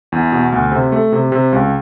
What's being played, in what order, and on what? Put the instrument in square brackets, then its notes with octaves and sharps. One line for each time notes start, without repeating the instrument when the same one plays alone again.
[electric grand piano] E2
B2
D2
C3
A3
C3
C3
C#2